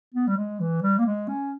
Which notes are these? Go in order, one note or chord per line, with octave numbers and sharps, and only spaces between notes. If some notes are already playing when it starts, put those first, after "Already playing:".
B3
G3
G#3
E3
G3
A#3
G#3
C#4